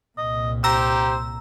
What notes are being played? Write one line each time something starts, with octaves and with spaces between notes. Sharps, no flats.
C2 A#2 D#5
G4 C5 A#5 E6